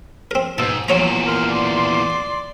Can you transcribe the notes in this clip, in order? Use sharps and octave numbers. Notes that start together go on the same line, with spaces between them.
C4 A#4
G#2 B2 A5 E6
E2 A#2 F#3 C#5 A#5 E7
A#4 C6
D5